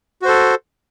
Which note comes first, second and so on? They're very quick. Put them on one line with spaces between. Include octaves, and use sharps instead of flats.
F#4 C5 A4